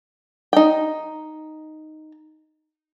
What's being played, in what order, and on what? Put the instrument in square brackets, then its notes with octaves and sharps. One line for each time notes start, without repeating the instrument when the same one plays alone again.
[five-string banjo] D#4 G5